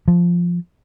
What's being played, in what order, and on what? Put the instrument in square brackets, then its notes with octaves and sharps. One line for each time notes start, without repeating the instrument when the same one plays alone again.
[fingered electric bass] F3